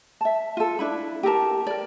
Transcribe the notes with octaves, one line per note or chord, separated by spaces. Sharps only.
E5 A5
F4 A4
D4 E4 B5
G4 A4 A#4 A5
A#4 D5